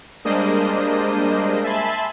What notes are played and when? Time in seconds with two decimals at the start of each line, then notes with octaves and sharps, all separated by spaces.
0.25 G3 G#3 A#3 D4 C5 D#5
1.64 E5 G#5 A5 B5 C6